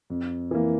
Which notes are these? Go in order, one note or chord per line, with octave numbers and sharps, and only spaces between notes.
F2
E3 A#3